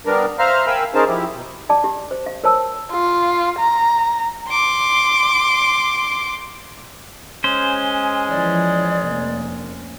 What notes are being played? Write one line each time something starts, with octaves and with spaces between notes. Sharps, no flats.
G3 B3 D4 A#4
C5 E5 F5 A#5 F6
A#4 F5 G5 G#5 B5 E6
C#4 D#4 G#4 A#4 C5 A5
F3 E4 G4
B2
D5 A5 D6
G4
C5
F5
A#4 C5 C#5 A5 E6
F4
A#5
C6 D6
G#3 C#4 C5 G#5
E3 F3 D5
F1 A#3